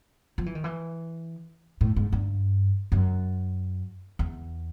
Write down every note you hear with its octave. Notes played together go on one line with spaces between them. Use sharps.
F3
E3
D#3
E3
A2
G#2
G2
F#2
E2